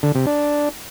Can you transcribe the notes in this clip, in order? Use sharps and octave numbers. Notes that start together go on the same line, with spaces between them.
D3
C3
D4